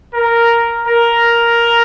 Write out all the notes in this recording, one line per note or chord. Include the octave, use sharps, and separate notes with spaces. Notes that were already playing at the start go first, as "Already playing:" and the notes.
A#4
A#4